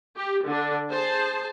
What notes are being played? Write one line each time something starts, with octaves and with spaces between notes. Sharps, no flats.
G4
D3 D4
G#4 C5 A5